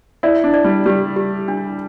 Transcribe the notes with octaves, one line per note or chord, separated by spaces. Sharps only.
E4 D5
D4
D5
G3
G3 G4
G4
D4